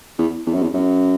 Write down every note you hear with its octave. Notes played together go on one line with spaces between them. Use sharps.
E2
E2
F#2
E2
F#2